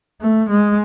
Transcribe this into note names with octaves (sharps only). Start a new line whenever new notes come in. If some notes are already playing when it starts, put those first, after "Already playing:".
A3
G#3